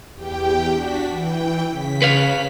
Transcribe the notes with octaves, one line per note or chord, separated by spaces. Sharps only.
E2 G4 G5
D4 F#4 B6
E3 G5
C#3 B6
B4 C#5 F5